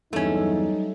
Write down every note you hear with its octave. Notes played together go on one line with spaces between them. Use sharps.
E2 G2 F#3 G3 A3 C#4 D#4